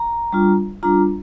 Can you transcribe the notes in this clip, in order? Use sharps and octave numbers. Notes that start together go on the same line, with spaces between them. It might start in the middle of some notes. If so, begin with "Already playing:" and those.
Already playing: A#5
G3 D4 F4
G3 D4 F4 A#5